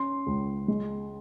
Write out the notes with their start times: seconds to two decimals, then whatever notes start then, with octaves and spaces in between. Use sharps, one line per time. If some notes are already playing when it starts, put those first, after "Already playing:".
Already playing: C#4 C6
0.26 C#2
0.68 G#3